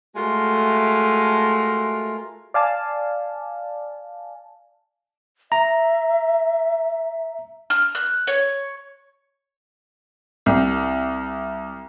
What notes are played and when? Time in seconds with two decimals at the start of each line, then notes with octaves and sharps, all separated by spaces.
0.15 G#3 A3 F4 F#4 A#4
2.54 D5 F5 G#5 A5
5.52 E5 A#5
7.70 F6
7.95 F#6
8.27 C#5
10.46 C2